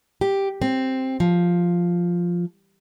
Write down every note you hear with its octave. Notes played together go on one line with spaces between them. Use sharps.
G4
C4
F3